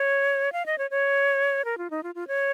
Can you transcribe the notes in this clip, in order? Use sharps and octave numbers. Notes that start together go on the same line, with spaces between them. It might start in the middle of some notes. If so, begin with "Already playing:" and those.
Already playing: C#5
F5
D#5
C#5
C#5
A#4
F4
D#4
F4
F4
C#5